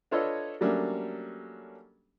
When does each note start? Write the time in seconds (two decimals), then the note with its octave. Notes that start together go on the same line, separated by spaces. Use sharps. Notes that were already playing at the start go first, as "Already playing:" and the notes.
0.11 D4 F4 A4 B4 C#5 D#5
0.61 F#3 G3 A3 A#3 C#4 D4